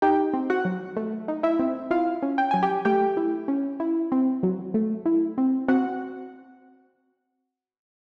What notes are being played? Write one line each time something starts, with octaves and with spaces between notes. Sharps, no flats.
D#4 G4 G5
C4
F#4 F#5
F#3
A3
D#4
E4 E5
C4
E4 F4 F5
C#4
G5
F#3 G#5
G4 G5
A3 G4 G5
E4
C#4
E4
C4
F#3
A3
E4
C4
C4 F#4 F#5